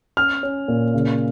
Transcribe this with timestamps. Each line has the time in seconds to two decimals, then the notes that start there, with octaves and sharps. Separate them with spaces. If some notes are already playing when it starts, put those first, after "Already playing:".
0.17 C#4 F6
0.43 C#4
0.68 A#2
0.94 C#3